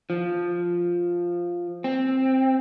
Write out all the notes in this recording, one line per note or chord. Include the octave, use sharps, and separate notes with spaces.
F3
C4